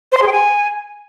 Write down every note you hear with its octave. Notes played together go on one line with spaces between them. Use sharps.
C5
C6
G#4
G5
G#5